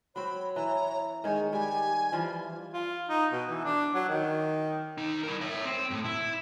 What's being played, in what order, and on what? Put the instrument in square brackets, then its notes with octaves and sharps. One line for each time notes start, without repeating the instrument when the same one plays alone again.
[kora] F#3 C4 [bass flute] C#5 [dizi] B5
[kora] E3 [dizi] A#5
[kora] D#3 C#5 [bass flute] G#3 [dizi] G#5
[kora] G3 [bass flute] G4 [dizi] G#5
[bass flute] E3 [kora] F3 G3 F4
[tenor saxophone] F4
D#4
B2
E3
D4
F#3
D#3
[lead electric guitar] D#2 D#4
E4 A#4
C#5 E5
C4
F#2 A2
E4